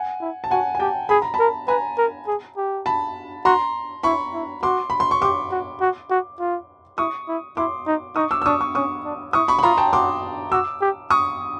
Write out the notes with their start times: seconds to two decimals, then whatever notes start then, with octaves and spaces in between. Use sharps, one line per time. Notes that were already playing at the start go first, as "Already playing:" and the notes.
Already playing: F#5 G#5
0.21 E4
0.44 A5
0.51 F#4 F#5 G#5
0.75 G#5
0.80 G4 G5 A5
1.09 G#4 B5
1.22 A#5
1.34 A5 B5
1.39 A#4
1.68 B4 G#5 A#5
1.98 A#4
2.27 G#4
2.57 G4
2.86 A5 B5
3.45 F#4 A#5 C6
4.03 E4 B5 C#6
4.34 E4
4.63 F#4 C6 D6
4.90 B5
5.00 C6
5.11 C#6
5.22 G4 C6 D6
5.51 F#4
5.81 F#4
6.10 F#4
6.39 F4
6.98 E4 C#6 D#6
7.28 E4
7.57 E4 C6 D6
7.87 D#4
8.16 D#4 C#6 D#6
8.31 D6 E6
8.42 E6
8.45 D4 C#6 D#6
8.61 C#6 D#6
8.75 C#4 C#6 D#6
9.05 D4
9.33 E4 C#6 D#6
9.48 B5 C#6
9.59 B5
9.63 F4 A#5 C6
9.78 G5 A5
9.93 F#4 C6 D6
10.52 F#4 D6 E6
10.81 G4
11.10 C#6 D#6